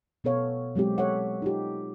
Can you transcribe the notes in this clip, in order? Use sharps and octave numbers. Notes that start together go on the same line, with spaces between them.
B2 B3 A4 C#5 F5
F#3 G#3 C4 G4
A4 C#5 E5 F#5
D#4 F4 G4